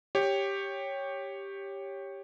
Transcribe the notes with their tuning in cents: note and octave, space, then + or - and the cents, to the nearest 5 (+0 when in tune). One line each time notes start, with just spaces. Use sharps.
G4 +5 C#5 -5